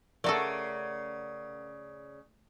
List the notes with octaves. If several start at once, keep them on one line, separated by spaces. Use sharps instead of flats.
C#3 A3 F#4 A4 A#4 D5 F#5 A#5